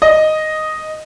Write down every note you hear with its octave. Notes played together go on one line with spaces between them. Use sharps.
D#5